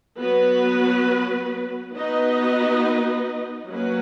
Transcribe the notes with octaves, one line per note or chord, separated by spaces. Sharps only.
F#3 B3 F#4 B4
B3 D#4 F#4 B4 D#5
F#3 A#3 C#4 F#4 B4